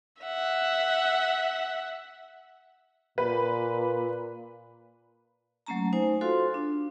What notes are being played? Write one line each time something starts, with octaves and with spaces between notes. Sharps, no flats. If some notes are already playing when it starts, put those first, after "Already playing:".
E5 F#5
A#2 B4
F#3 A3 A#3 C#4 A5 A#5
D#4 C5 G#5
F4 F#4 A4 C5 F5 C6
D4